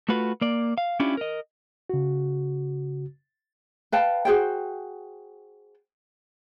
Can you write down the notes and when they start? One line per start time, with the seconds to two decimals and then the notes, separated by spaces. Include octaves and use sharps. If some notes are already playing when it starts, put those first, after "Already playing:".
0.09 A3 F4 F#4 B4
0.41 A#3 D5
0.78 F5
1.00 C#4 D4 E4 F4 G4
1.17 A#4 D#5
1.90 C#3 F#4
3.92 B4 F5 G5 A5
4.25 F#4 G#4 C5 G5